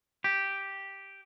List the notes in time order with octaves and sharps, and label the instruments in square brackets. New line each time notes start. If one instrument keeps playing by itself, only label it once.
[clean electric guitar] G4